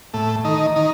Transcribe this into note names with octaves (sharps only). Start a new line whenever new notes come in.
A2 A3
D#3 D#4
D#3 D#4